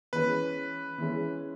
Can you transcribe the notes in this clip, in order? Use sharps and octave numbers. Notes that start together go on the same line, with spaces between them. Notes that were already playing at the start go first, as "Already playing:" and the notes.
E3 G#3 C#4 B4
E3 G#3 C#4